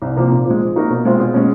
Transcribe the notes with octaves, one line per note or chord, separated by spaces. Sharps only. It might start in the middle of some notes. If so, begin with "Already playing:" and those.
C2
C3 F3 A#3
A#2
F3 G#3
F3
A#3 D#4 F#4 A#4
B2
G#3 C4 F4 G#4
B2
G#3 C#4